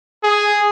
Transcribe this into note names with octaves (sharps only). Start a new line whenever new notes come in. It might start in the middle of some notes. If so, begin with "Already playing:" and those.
G#4